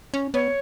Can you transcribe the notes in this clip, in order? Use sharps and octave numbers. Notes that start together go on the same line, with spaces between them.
C#4
B3 C#5